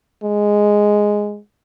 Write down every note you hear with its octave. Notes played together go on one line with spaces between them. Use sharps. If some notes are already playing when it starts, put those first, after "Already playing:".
G#3